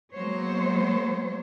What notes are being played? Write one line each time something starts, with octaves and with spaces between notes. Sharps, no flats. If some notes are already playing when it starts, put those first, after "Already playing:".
F#3 G#3 A#3 B3 C5 C#5